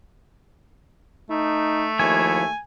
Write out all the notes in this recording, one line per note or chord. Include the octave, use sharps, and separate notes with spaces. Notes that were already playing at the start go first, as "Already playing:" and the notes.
A3 D#4
D#2 F3 E4 C#5 G#5